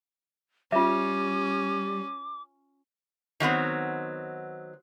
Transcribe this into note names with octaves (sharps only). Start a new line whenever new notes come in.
G3 C#4 F4 E5 D6
D#3 F#3 B3 C4